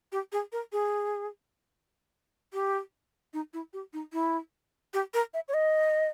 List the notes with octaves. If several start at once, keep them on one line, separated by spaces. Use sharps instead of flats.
G4
G#4
A#4
G#4
G4
D#4
E4
G4
D#4
E4
G4
A#4
E5
C#5
D#5